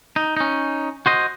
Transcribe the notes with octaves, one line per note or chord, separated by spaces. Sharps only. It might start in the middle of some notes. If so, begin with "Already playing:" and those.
D#4
C#4 D#4
F#4 C5 D#5